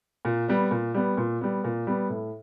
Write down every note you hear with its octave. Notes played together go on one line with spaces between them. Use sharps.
A#2
G3 B3
A#2
G3 B3
A#2
G3 B3
A#2
G3 B3
A2